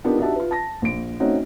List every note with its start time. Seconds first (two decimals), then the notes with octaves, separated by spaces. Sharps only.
0.04 B3 D4 D#4 F4 G4 A#4
0.18 D4 D#4 F#4 G4 E5 A5
0.36 F4 B4
0.51 A5 A#6
0.82 A#1 D7
1.20 A3 C4 C#4 D#4 F#4